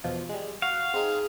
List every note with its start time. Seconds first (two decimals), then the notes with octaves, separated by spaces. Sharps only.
0.04 E2 B2 F3
0.29 G3 G#3
0.62 F#4 F5 F#5
0.94 C4 D#4 G#4